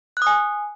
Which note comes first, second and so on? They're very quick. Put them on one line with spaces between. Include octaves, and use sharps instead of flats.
F#6 D#6 G#5